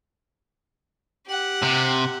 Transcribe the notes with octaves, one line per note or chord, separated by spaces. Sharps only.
G4 F#5
C3